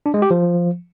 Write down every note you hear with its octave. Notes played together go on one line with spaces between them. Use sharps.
D4
G#3
G4
F3